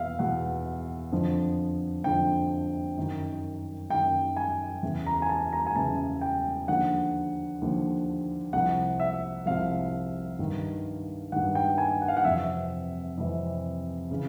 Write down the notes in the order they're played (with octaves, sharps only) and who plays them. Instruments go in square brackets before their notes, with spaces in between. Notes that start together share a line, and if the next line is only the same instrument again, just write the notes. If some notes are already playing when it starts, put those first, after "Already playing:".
Already playing: [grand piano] E2 B2 E5 F5
E2 B2 F#5
F2 D3 F3
F2 D3 F3 G5
F#2 D#3
F#2 D#3 G5
G#5
E2 C#3 E3
A#5
G#5
A5
A#5
G#5
E2 C#3 E3 A5
G5
D#2 D3 F3 F#5
D#2 D3 F3
C2 C3 F3 F#5
E5
C2 C3 F3 F5
G2 D#3
G2 D#3 F#5
G5
G#5
F#5
F5
F#5
F2 C3 E3 E5
F2 C3 E3
C#3 E3